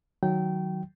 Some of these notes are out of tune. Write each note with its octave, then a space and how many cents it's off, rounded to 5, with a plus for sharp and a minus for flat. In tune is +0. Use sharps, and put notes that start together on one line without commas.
D#3 +5 F#3 +0 G5 -20